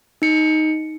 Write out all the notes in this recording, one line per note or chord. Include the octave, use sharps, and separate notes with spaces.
D#4 C#7